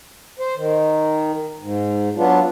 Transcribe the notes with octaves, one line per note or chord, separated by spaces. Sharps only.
C5
D#3
G#2
F#3 B3 D4 F4